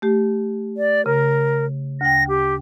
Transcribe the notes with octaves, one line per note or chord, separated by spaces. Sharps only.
A3 G4
D5
C#3 A#4
D2 G5 A#6
G4